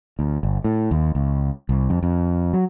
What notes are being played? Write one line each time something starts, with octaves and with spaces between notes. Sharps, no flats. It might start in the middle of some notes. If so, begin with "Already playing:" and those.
D2
G1
A2
D#2
C#2
C2
F2
F2
F#3